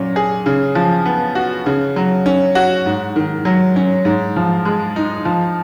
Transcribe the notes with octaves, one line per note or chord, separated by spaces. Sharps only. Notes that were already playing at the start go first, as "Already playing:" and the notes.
Already playing: A#2 F#3 C#4
G#4
C#3
F3
B3
F#4
C#3
F#3
C#4
F#4
G#2
D#3
F#3
C#4
G#2
F3
G#3
D#4
F3